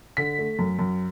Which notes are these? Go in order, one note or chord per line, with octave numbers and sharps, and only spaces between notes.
D3 B6
A3
F#2
F#2